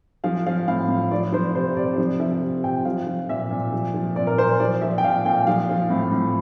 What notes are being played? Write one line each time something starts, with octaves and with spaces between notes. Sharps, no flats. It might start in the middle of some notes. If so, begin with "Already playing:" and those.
F3 F5
F3 F5
A2 F5
A2
F3 D5
F3 C5
C3 C5
C3 D5
F3
F3 E5
C3
C3 G5
F3 F5
F3
A#2 E5
A#2
F3
F3
A#2 D5
A#4
A#2 C5
F3 D5
F3 E5
G5
A#2 F5
A#2 G5
F3 F5
F3
A2
A2